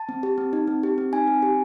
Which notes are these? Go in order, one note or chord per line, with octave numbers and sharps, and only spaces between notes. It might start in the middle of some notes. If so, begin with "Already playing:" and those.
Already playing: A5
C4
G4
C4
D#4
C4
G4
C4
D#4 G#5
C4
G4